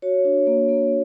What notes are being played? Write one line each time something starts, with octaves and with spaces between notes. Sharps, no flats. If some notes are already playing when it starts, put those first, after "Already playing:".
F#4 C#5
D4
A#3
A#3